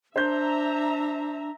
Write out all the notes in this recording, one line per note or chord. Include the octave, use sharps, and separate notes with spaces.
D4 C5 E5 A#5 G6